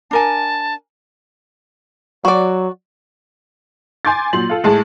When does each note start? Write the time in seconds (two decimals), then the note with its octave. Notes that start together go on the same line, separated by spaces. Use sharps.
0.11 D4 A#4 G#5 A5
2.25 F#3 F#4 D5
4.05 G#5 C6 D6 G6 A6
4.33 A#2 F#3 C6 F#7
4.49 F4 A4
4.64 A2 G#3 G#4 A5